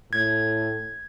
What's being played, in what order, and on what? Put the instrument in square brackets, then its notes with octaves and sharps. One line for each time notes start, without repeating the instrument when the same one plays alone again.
[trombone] A2 [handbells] G#6